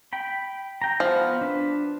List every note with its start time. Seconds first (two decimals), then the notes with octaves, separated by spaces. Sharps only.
0.13 G5 B5
0.82 G5 A#5
1.00 F3 B3
1.41 D4 B4